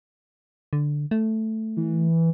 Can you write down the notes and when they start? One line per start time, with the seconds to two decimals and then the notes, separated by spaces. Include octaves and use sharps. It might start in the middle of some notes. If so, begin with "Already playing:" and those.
0.73 D3
1.11 A3
1.77 E3